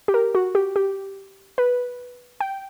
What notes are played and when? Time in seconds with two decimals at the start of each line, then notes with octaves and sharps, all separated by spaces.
0.08 G4
0.14 A#4
0.35 F#4
0.55 G4
0.76 G4
1.58 B4
2.41 G5